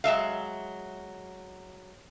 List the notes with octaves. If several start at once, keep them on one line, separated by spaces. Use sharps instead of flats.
F#3 G#3 E5 F5